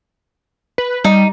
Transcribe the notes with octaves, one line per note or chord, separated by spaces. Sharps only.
B4
G3 D#4